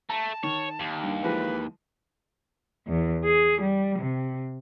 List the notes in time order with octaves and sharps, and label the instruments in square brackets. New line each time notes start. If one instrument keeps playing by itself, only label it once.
[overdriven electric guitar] A3 [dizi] A5 [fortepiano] A#5
[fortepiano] D#3 [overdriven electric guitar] C#5
[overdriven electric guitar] D#2
[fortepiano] G2
[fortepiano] E3 F3 G#3 [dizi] B4
[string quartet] E2
G#4
G3
C3